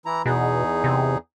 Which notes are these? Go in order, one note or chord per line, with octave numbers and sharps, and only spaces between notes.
E3 E4 A#5
E2 B2 D#4 G#4
C3